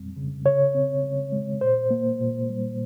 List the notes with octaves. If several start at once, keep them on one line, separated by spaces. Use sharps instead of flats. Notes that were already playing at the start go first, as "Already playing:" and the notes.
Already playing: F2 G3 C4
C#3
C#3 C#5
C4
C#3
G#3
A#2 C5
A#3
A#2
G3